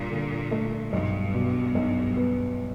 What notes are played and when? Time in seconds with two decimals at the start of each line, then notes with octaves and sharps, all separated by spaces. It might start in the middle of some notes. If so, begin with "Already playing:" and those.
Already playing: G2 A#2
0.10 D3
0.51 A3
0.92 B1 G2
1.34 B2
1.75 B1
2.17 B3